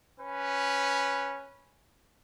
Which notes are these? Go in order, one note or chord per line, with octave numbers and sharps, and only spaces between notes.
C#4 B4